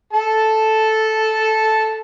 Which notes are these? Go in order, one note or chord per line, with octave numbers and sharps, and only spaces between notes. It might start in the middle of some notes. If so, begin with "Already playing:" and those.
A4 A5